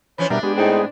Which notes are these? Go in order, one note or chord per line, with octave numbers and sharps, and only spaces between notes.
E3 F3 C#4 B4 C#5
B2 G3 D4 A#4 E5
G#3 B3 G4
A2 C4 D#4 G#4